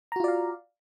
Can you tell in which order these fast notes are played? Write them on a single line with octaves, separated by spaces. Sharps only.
A#5 F#4 F4 D5 F5